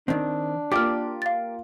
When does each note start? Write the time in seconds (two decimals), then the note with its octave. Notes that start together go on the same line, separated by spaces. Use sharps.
0.08 D#3 C4 D4
0.72 A#3 F4 G4 D5 D6 F6
1.22 F5 A6